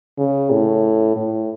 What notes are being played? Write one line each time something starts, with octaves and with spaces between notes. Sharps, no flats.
C#3
A2
A2